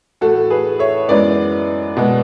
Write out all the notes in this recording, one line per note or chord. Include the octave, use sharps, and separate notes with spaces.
A2 E3 A3 F#4 A4
G#4 B4
C#5 E5
F#2 E3 G#3 B3 B4 D5
B2 G#3 B3